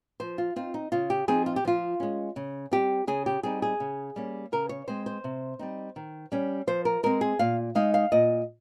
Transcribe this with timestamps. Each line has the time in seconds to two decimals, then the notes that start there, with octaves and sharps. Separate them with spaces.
0.20 F3 C5
0.38 F4
0.56 C4 D#4 F4
0.74 D#4
0.92 C#3 F4
1.10 G4
1.28 F3 C4 D#4 G#4
1.46 F4
1.56 G4
1.65 F3 F4
2.00 G#3 C#4
2.36 C#3
2.71 G3 C4 G4
3.07 C#3 G#4
3.26 G4
3.43 G3 C4 D#4 G#4
3.62 G#4
3.80 C#3
4.16 G3 A#3 C#4
4.52 C#3 A#4
4.69 C#5
4.88 G#3 C4 C5
5.06 C5
5.24 C3
5.59 G3 C4 D#4
5.96 D#3
6.32 G3 C#4
6.67 F3 C5
6.85 A#4
7.03 G#3 C4 A#4
7.21 G#4
7.39 A#2 F5
7.75 G#3 D#4 F5
7.94 F5
8.12 A#2 D#5